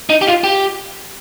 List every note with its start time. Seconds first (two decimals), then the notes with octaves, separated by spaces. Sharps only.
0.10 D#4
0.22 G4
0.27 F4
0.44 G4